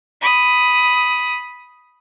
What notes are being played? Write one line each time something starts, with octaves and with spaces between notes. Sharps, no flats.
B5 D#6